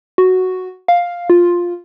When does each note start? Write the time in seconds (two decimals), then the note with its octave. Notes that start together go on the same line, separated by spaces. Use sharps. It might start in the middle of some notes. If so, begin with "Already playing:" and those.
0.18 F#4
0.88 F5
1.30 F4